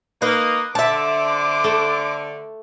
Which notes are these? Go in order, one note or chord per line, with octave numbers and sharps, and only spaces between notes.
A#3 D#4 B4
D3 C5 E5 A5 D6
A3